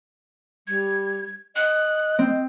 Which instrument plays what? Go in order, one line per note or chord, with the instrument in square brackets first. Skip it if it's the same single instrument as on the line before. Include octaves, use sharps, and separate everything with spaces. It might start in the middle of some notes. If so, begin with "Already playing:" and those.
[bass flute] G3 [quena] G#6
[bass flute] D#5 [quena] F#6
[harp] C4